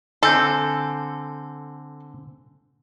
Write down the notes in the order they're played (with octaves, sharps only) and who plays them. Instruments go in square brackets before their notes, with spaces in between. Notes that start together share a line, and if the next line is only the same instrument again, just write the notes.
[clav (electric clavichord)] D3 C4 [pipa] A4 [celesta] G#5 G6